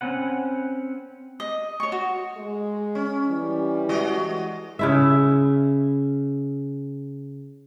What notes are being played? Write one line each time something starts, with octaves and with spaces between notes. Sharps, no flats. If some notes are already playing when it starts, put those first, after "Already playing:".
C4 C#4 B4 F#5
D#5
C#5 C#6
F#4
G#3
C#4
E3 G3
G#3 F#4 D#5
C#3 E4 E5